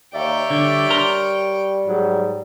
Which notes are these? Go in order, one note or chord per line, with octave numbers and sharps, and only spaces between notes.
D#2 C#5 D5 E5 G5
D3 G3
A#4 A#5 C6
G#2 F#3